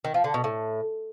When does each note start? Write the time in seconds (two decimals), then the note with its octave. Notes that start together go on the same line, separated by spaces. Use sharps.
0.04 D#3
0.14 F3
0.24 D3
0.34 B2
0.44 A2